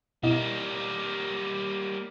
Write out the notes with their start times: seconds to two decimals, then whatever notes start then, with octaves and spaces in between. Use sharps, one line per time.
0.23 B2 G3 A#3 E4 D#5